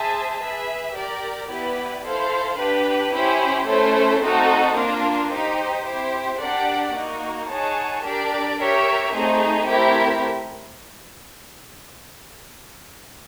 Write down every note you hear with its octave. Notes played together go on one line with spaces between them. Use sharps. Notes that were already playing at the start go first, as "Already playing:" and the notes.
Already playing: G#4 C5 E5 A5
G#4 B4 E5
G4 A#4 D5
B3 E4 G4 B4 D5
E4 A4 C5 F5
D4 G4 B4
C#4 E4 G4 C5
A3 C#4 E4 A4 C5
A3 C4 D#4 F#4 A4
A#3 D4 F4 A#4
D#4 G4 C5
C4 E4 G4 C5
D4 G4 A#4 D5 F#5
A#3 D#4 F#4
D#4 G#4 C#5 F#5 A5
D4 G4 A#4 D5
G4 A#4 C#5 E5
A3 C4 D#4 G#4
A3 C4 E4 G4 A#4